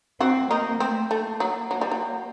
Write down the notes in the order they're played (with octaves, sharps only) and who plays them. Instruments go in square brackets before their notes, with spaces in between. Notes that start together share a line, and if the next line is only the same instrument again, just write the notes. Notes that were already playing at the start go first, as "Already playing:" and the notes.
[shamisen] F#3 F#4 [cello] C4
[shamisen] D#3 D#4 [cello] A#3
[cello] A3 [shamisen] C4
[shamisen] A3 [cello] A#3
[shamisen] F#3
F#3
G3
F#3